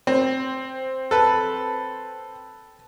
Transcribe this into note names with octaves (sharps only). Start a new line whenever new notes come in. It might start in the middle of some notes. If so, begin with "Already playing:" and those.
C4
A4 B4